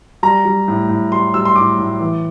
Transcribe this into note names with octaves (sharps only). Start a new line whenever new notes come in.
G3 A#5
G3
A2
A2
G3 C6
G3 E6
C6
A2 D6
A2
E3